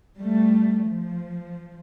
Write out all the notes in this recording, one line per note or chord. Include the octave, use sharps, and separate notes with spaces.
G3 A3
F3